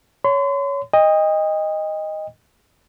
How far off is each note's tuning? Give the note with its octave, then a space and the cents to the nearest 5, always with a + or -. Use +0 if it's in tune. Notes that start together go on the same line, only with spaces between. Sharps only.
C#5 +15 C6 -40
D#5 +0 G5 +40